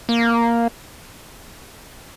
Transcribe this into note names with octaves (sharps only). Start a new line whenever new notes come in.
A#3